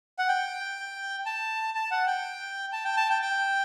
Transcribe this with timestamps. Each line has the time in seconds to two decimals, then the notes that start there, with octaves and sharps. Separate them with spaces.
0.19 F#5
0.28 G5
1.26 A5
1.75 A5
1.91 F#5
2.07 G5
2.73 A5
2.85 G5
2.97 A5
3.10 G5
3.22 G5